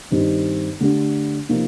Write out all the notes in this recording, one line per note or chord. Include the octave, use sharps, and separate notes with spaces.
G2 D#3 G3 C4 D#4
D3 A3 D4 G4
C3 F3 A#3 D#4